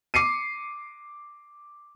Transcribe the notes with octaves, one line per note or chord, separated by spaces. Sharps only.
D6 C7 C#7 D#7